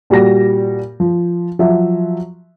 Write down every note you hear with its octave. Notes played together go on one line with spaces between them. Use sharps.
A#2 G3 F#4 G4 A#6
F3
F3 F#3 F#4 E5